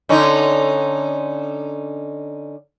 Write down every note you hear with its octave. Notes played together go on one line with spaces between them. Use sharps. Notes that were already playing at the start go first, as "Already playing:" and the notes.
D3 C#4 D#4